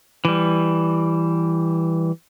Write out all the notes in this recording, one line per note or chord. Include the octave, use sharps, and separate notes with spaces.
E3 G3